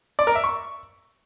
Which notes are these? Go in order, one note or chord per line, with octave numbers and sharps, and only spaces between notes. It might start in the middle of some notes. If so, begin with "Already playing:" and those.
D5
A#4
E5
C#6